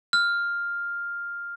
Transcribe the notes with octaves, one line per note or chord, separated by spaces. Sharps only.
F6